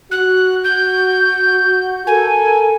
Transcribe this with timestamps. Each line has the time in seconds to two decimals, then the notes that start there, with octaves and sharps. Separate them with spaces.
0.11 F#4 F#6
0.64 G6
2.07 A4 A#4 G#5